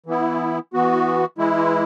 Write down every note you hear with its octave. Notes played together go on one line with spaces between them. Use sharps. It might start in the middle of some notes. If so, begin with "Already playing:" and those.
E3 B3 E4
E3 B3 F#4
E3 G#3 E4